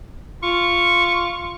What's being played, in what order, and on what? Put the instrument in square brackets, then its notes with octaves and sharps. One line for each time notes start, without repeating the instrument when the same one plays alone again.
[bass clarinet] F4 [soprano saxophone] C#6